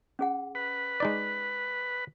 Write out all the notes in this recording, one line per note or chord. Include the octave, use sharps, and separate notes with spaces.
C#4 G#4 F#5
B4
G#3 D#4 D5